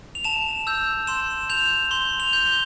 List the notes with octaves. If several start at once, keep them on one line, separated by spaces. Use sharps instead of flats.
F7
A5 E7
E6 G6
C6 E7
G6 F7
C6 G7
F7
G6
G7